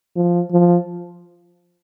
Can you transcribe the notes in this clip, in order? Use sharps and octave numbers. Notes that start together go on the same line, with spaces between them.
F3
F3